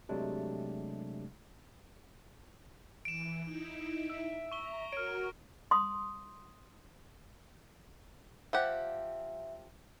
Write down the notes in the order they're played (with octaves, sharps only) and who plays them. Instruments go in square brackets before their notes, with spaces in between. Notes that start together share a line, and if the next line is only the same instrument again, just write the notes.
[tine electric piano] C3 F#3 G#3 A3 D4 G4
[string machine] E3 [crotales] D7 E7
[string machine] D#4 E4
[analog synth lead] E5
[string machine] A#5 [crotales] C#6 G7
[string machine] F#4 A#4 [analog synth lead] C#5 [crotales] F6 D7
[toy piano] C6 D#6
[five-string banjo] F3 G4 F#5 [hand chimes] E5